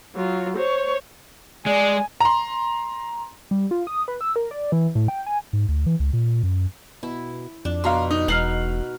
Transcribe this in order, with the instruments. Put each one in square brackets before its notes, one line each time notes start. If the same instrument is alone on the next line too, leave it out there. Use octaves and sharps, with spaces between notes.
[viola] F#3 F4
C5 C#5
[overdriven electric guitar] G#3 [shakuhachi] D5 [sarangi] G#5
[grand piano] A#5 C6
[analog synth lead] G3
F4
D#6
B4
E6
A#4
D5
E3
A2
G5
G#5
[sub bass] G#2
D2
E3
C#2
A#2
F#2
[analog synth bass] B2 [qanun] E4
[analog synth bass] F2 [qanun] D4
[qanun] B2 [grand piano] F5 A#5 C6
[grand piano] D#4
[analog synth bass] E1 [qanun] D#4 F#5 [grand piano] F6 C7 F#7